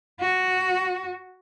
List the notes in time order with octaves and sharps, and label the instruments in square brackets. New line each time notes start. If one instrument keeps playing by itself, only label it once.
[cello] F#4